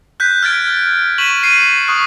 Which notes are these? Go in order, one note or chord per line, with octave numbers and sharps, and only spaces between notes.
F#6 G6 B6
F6 G#6 A6 D7
C#6 B6 D#7 E7 F#7
C7 C#7 D#7
C#6 D#6 F#6